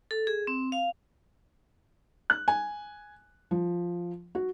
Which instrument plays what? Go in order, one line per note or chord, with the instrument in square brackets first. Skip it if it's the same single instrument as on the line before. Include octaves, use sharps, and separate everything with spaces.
[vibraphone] A4
G#4
C4
F5
[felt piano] F#6
G#5
F3
F#4